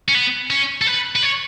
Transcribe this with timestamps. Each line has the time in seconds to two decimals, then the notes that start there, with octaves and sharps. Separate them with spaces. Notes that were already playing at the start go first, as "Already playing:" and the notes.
0.08 C#4
0.15 B3
0.50 C#4
0.81 A4
0.87 B4
1.16 B4
1.23 C#5